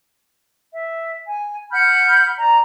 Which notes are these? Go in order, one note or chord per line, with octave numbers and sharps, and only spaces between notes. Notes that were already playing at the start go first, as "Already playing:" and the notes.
E5
G#5
F#5 B5 F6 G6
D5 A#5